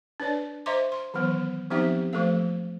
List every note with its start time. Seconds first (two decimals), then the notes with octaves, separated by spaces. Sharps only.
0.20 D4 B4 C#5 D5
0.66 C5 D#5 E5 A#5 C6 D6
0.92 C6
1.14 D#3 E3 F#3 B3
1.70 F3 B3 C4 D#4 G4 E5
2.13 F3 A3 A#3 A4 F5